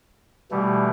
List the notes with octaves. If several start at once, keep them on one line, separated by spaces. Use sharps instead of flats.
B2 E3 G3 A3